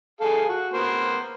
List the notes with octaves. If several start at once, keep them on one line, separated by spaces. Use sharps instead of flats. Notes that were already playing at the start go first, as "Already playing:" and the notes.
G#4 A4 F5
F#4
A#3 B3 C5